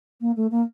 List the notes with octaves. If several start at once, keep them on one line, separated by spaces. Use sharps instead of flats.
A#3
A3
A#3